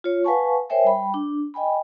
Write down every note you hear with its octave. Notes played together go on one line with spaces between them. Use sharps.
F4 C#5
B4 F5 F#5 G#5 A5 C#6
A#4 C5 C#5 E5 G5 G#5
G3 G5 B5
D4
D#5 G5 G#5 B5